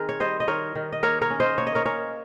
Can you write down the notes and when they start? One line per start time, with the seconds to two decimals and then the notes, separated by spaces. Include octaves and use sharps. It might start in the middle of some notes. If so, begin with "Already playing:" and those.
Already playing: D#3 C4 D#4 G#4 A#4
0.09 C#5
0.20 G3 C5 D#5
0.40 D#5
0.48 D#3 A#4 C#5
0.75 D#3
0.92 D#5
1.03 A#3 A#4 C#5
1.21 A#4 C#5
1.30 C#4
1.40 C5 D#5
1.58 A#3 C#5
1.67 D#5
1.75 A#4 C#5
1.85 C#4 A#4 C#5